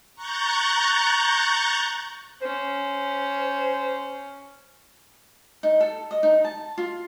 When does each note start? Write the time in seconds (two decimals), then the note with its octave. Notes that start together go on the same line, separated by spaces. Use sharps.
0.14 A#5 C#6 F#6 G6 A6
2.42 C#4 C5
5.63 D#4
5.80 A4
6.11 D#5
6.23 D#4
6.44 A5
6.78 F4